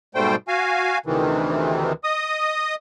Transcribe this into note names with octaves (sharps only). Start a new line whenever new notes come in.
G#2 B2 G3 A3 C5 G5
F#4 F5 G#5
D2 C3 D#3 E3
D#5 D#6